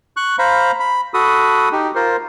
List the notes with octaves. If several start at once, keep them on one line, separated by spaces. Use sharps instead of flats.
C#6 F#6
C5 F5 A#5 B5
B5
F#4 A4 B5 D#6
D#4 G4
F4 A#4 C5